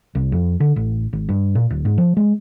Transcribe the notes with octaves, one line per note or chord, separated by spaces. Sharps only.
C2
F2
D3
A1
G#1
G2
A#2
D1
G#2
F3
G#3